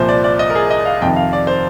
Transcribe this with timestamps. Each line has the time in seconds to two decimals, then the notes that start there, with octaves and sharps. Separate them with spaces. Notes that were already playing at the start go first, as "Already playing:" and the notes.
Already playing: C2 A#2 F3 C5
0.09 D5
0.24 D5
0.39 D#5
0.50 A#4
0.55 G#4
0.70 D#5
0.85 F5
1.01 F2 C3 D#3 G5
1.16 F5
1.33 D5
1.47 C5